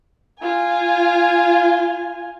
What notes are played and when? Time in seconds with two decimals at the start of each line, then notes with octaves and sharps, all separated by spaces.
0.40 F4 G#5